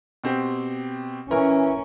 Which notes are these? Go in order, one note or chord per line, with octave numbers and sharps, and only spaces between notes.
B2 C4 G4
E3 C#4 A#4